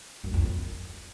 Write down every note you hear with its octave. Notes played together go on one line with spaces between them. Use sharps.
F#2
F2
F#2